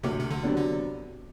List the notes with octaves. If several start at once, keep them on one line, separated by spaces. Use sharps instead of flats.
D2 C3
C3
D3
C3 F#3 B3 D4
D3